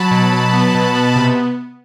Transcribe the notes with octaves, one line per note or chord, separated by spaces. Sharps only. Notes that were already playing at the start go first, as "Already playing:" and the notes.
Already playing: F#3 A5 B5
B2
F#3
B3
B2
B3
C3